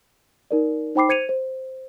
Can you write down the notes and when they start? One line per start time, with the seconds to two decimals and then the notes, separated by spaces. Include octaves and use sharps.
0.51 D#4 A#4 D5
0.95 D#4 C5 G5 B5 D6 C7
1.09 C5 G#6 C#7 D#7 F7
1.29 C5